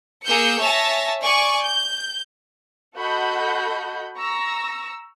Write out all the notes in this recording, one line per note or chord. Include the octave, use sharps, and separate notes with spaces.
A#3 G#4 E6 G6 C#7
C#5 E5 G#5 A5 A6 A#6
D5 G#5 C#6
G6
F#4 A4 D#5 F#5 B5 G6
A#5 C#6 E6 A#6